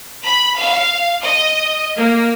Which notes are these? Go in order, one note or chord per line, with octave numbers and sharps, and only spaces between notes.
B5
F5
D#5
A#3